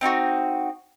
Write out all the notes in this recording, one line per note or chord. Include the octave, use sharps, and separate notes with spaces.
C4 D#4 E4 F#4